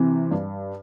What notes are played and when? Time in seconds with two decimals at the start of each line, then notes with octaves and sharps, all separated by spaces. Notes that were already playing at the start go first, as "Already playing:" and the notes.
Already playing: C3 E3
0.31 G2